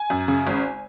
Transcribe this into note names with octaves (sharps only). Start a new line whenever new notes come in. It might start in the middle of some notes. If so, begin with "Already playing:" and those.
Already playing: G#5
F#2
C#3
G#1